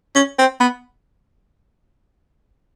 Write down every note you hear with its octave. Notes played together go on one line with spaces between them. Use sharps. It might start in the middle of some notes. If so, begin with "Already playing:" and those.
C#4
C4
B3